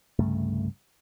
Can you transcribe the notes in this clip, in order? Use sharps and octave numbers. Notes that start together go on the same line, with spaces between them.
C2 G2 C#3 A3